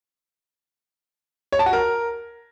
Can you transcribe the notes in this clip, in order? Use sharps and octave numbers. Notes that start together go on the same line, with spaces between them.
C#5
A5
F#4
A#4